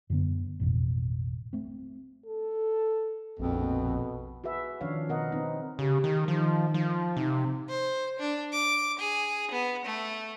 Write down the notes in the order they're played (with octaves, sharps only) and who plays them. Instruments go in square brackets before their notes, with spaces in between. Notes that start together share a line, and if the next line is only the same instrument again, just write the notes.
[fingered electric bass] F#2 D3 B3
A1 F2 B2
A3 C4
[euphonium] A4
[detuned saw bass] A#1 [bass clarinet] F2 [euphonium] B2
[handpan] F#4 G#4 B4 E5
D#3 F3 C#4 D4 C#5 F5
B2 B3 A#4 D#5 F#5
B3 C4 D#4
[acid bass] C#3 [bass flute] G4
[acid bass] D#3
[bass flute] D#3 [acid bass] F3
[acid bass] F3
[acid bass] C3 [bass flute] D#4
[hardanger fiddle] C5
D4
D6
G#4
B3
A3